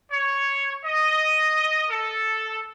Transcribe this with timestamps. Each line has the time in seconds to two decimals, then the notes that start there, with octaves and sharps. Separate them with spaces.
0.11 C#5
0.85 D#5
1.90 A4